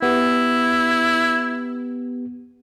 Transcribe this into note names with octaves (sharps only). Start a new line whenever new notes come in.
B3 E4 G4